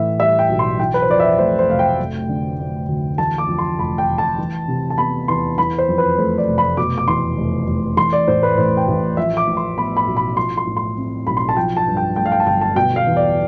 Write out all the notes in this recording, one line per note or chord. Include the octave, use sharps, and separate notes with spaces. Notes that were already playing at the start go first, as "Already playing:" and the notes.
Already playing: A2 E3 E5
G3 E5
G5
B1
C6
E3 G5
B4
C5
F2 D5
E5
A3 C5
C5
F1 F5
G5
A3
D3
D4
D2
E3 A5
D6
F2
C6
F1 B5
G5
F1
A5
E3
C3
A5
B3 B5
E2 C6
E3 B5
C5
F2
B4
A3 C5
D5
F1
B5
B2 D6
D6
E2 C6
F1
F1
E3 C6
D5
A2 C5
B4
A1 C5
G5
A1
F3 E5
D6
A2
C6
B3 B5
B5
B1
B5
F3 C6
C6
A2
C6
C4
B1 B5
C6
A5
F3 G5
A5
G2
G5
A3 G5
F5
G5
A5
G1 G5
A5
B2 G5
F5
E2
D5